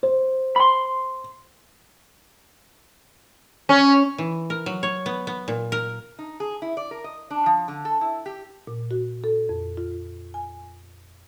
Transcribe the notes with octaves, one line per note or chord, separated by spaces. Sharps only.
C5
B5 C6
C#4
E3
A#4
F#3
C#5
B3
B3
A#2
A#4
D#4
G#4
E4
D5
A#4
D#5
D4
F3
D3
A4
E4
G4
A#2
F#4
A4
F2
F4
G#5